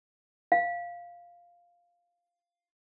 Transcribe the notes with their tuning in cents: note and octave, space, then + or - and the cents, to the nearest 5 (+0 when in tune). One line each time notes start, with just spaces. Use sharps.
F5 +0